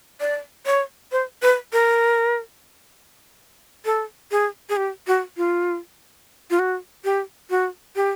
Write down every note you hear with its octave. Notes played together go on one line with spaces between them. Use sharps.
D5
C#5
C5
B4
A#4
A4
G#4
G#4
G4
F#4
F4
F4
F#4
G4
F#4
G4